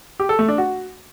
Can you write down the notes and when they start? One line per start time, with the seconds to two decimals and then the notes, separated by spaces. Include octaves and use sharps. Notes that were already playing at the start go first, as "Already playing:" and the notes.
0.20 G4
0.29 A4
0.39 A3
0.48 D4
0.58 F#4